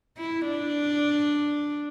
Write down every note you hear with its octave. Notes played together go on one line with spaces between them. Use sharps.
E4
D4